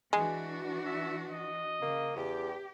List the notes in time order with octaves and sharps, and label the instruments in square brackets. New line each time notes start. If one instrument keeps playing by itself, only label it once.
[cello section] E3 D4 F#4 [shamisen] G#3
[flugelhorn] E5
D#5
[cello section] C#3 [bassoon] A#3
[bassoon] E2 [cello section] G4